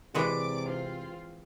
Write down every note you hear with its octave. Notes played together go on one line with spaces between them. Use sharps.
C3 E3 G#3 F#4 D5 D6
C4 F4